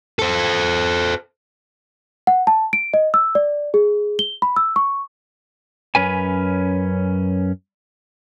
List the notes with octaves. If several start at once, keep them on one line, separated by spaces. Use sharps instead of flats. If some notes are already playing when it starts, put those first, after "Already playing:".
A4 C5
F#5
A5
D7
D#5
E6
D5
G#4
G7
B5
E6
C#6
F#2 C#4 B4 G#5